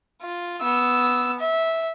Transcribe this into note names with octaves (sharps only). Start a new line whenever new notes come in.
F4
B3 E6
E5